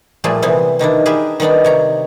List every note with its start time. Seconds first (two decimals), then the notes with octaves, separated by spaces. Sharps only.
0.24 A#2 F3 G3 A3 G#4
0.42 C3 E3 B3 C4
0.79 B2 D#3 D4 E4
1.06 G4 G#4 A#4 B4 E5
1.40 D#3 G3 B3 D4 D#4
1.65 C3 C#5 A#5